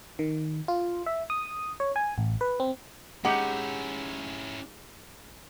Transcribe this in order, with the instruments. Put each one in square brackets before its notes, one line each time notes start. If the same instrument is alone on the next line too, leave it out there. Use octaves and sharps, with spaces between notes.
[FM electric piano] D#3
F4
E5
D#6
C#5
G#5
A1
B4
C4
[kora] G#3 D#4 G4 [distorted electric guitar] C#4 E4 [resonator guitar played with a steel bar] F#5